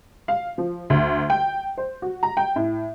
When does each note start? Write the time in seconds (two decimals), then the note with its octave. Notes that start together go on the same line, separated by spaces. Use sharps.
0.28 F5
0.58 F3
0.90 D2
1.30 G5
1.77 C5
2.02 F#4
2.23 A#5
2.37 G5
2.56 A2